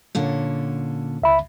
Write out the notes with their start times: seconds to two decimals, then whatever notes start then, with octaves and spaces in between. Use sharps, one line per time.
0.15 A#2 D3 C#4
1.22 C#2 E5 B5